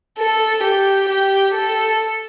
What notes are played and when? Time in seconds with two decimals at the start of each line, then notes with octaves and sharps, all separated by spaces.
0.19 A4
0.63 G4
1.09 G4
1.54 A4